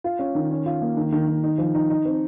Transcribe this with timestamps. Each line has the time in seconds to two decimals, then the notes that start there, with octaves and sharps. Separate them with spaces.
0.04 F4
0.19 C#4
0.35 D#3
0.51 C#4
0.66 F4
0.82 A#3
0.97 D#3
1.12 D#3
1.27 D#3
1.44 D#4
1.58 F3
1.75 D#4
1.90 D#4
2.05 C4